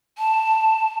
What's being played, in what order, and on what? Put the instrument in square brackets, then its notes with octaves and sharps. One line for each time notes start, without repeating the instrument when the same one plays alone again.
[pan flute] A5